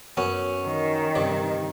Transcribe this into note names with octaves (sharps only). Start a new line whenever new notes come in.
F#2 B3 C#4
D#3
G2 C3 D5